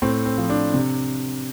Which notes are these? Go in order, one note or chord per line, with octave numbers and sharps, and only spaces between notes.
A2 C4
C4
F3
D4
C3